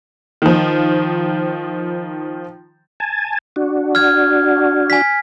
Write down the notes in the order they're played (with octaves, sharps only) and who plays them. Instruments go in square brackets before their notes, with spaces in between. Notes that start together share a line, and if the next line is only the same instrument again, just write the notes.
[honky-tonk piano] D#3 F3
[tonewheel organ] G#5 A5
D4 F#4
[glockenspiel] F6 G#6
G#5 B6